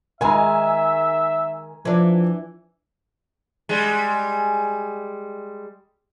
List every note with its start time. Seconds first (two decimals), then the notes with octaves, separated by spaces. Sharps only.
0.21 D#3 G#3 E5 G#5 A#5
1.85 E3 F3 D4
3.69 G3 G#3